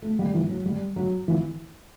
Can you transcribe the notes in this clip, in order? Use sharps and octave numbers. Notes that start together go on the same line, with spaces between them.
A3
G3
E3
F#3
G3
F#3
E3